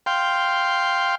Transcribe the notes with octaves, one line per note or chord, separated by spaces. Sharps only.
F5 G5 C6